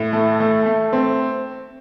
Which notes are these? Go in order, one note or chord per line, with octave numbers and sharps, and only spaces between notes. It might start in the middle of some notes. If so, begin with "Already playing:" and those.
Already playing: A2
A3
A3
A3
C4